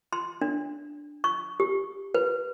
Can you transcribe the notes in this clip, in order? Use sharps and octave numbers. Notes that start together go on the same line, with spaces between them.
C6
D4
C#6
G4
B4